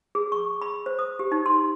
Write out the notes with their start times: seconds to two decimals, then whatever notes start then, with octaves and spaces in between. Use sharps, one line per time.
0.15 G#4
0.32 C#6
0.61 B5
0.86 C5
0.99 D#6
1.19 G4
1.32 D#4
1.46 C6